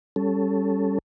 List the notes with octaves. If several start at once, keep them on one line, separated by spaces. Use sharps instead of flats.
G3 C#4 A4